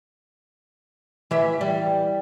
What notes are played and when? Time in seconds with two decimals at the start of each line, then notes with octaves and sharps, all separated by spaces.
1.31 E3 E5
1.61 G3